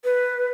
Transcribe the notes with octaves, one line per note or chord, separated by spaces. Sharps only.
B4